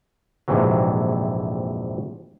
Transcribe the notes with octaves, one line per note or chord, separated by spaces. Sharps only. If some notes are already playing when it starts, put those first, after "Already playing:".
A#1 F2 G#2 C3 E3 F#3